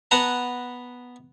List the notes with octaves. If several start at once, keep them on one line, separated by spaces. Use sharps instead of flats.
B3 B4 F#5 A5 A#5